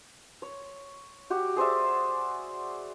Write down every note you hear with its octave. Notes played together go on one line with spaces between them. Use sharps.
C#5
F#4 G4
G#4 C5 D5 E5